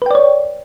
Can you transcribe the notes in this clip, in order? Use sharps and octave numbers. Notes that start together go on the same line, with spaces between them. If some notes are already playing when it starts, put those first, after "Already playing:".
B4 C#5 D5 G5